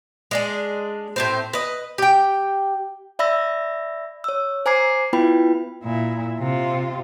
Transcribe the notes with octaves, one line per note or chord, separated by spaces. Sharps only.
G#3 D4 G#4
A2 C4 C5
B4 D#5
G4 G5
D5 E5 B5 E6 A#6
C#5 E6
C5 G#5 A#5 D6 G#6 C7
B3 E4 F4 B4 G5 B5
A#2 E4
C3 F4